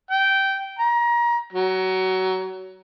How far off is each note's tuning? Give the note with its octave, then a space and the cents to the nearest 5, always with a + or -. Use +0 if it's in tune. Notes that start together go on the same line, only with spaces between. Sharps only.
G5 -15
A#5 +30
F#3 +20